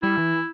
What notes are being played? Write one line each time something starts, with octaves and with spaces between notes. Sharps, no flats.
G3 E4
E3